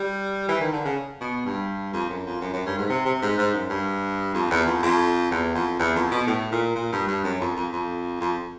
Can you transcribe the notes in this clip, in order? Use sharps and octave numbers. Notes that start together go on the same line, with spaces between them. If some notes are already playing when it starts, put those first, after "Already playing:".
Already playing: G3
E3
D#3
D3
C#3
B2
G2
F2
F#2
F2
F#2
F#2
G2
G#2
C3
C3
G#2
G#2
F#2
G2
F2
E2
F2
F2
E2
F2
E2
F2
B2
A2
A#2
A#2
G2
G2
F#2
F2
F2
F2
F2